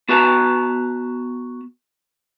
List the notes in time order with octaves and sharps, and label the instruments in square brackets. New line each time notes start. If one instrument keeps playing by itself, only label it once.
[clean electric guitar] B3 F#4 B4 A5 A#5